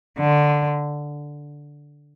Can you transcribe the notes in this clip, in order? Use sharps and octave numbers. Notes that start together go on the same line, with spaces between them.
D3